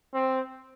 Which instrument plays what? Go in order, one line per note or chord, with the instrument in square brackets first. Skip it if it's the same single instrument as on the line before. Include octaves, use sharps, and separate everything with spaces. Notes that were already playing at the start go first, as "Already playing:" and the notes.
[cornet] C4